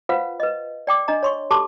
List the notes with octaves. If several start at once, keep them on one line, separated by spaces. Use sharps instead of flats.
F4 B4 C5 F5 F#5
B4 D#5
D5 G5 D6
D4 D#5 A#5
C#5 C6 C#6
G4 A4 A5 C6 D6